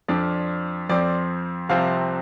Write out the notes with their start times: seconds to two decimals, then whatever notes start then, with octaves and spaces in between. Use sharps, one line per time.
0.08 F2 F3 D4 D5
0.89 F2 F3 C4 D5
1.69 C2 C3 F3 C4 F5